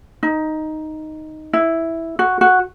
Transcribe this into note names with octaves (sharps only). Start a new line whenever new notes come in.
D#4
E4
F#4
F#4